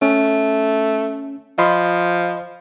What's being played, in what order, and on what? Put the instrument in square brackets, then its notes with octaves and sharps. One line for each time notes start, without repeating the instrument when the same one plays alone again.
[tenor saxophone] A3 [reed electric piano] C#4
[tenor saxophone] F3 [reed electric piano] D#5 B5 C6